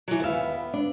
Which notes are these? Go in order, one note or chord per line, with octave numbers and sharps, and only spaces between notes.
E3 F#3
D#2 B3 B4 E5 F5
D4